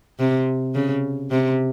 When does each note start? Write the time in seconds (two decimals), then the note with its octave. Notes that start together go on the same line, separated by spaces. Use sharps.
0.19 C3
0.75 C#3
1.31 C3